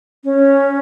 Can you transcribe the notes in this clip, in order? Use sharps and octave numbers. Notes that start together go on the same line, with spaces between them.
C#4